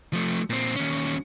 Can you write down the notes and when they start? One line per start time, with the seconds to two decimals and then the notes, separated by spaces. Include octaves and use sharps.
0.13 F3 A3
0.50 A#2 C4
0.76 D#2 C#4